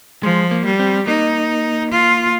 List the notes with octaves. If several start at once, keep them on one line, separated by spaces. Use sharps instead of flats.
F3 G#3
A#3
G3
C4
A#3 D#4
F4